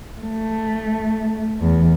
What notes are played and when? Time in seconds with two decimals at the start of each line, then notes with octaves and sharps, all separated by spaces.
0.22 A3
1.61 E2